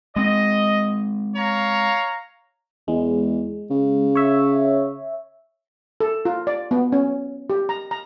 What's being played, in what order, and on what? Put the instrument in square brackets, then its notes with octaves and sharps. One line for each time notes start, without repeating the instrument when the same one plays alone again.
[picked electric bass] G#3 C4 [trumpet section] D#5
[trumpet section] C#5 F5 A#5
[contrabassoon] E2 [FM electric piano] G#3
[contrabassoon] C#3
[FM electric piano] C#5 E5
[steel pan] A4
F4
D5
B3
C#4
G4
A#5
A#5